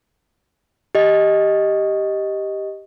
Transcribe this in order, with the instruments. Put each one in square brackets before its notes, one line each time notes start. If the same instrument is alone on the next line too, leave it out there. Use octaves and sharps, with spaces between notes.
[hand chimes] G4 D#5